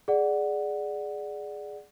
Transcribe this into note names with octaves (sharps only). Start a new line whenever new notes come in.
G#4 D5 F#5